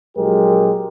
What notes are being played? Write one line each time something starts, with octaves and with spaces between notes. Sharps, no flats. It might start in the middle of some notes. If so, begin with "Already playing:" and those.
A#1 F#3 G#3 G4 A#4